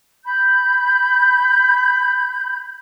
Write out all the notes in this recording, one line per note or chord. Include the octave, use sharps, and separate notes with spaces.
B5 G6